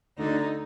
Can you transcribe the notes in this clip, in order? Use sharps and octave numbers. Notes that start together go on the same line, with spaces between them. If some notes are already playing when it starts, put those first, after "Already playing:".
D2 D3 D#4